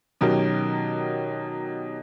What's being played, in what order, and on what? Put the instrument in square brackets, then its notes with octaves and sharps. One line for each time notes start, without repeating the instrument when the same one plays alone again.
[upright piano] B2 D#3 F#3 C#4 G4 A#4